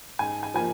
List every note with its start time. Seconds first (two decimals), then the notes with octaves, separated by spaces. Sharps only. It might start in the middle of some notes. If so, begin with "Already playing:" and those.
0.19 G#2 G#5
0.43 G#5
0.54 F3 A#3 G#5